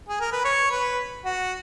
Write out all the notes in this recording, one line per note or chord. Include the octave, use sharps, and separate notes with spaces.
G#4
A#4
B4
C#5
B4
F#4